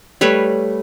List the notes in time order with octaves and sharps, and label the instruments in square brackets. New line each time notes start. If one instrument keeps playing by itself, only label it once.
[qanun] G3 A3 B4 C#5